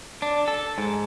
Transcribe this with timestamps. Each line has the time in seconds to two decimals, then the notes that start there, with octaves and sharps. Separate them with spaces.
0.22 D4
0.48 A4
0.78 G#2